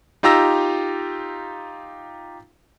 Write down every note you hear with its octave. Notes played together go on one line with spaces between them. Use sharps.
D#4 F4 G4 A#5 E6 A#6